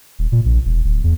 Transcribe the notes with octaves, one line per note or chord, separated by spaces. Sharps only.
D#1
A#2
A#1
E1
D1
E2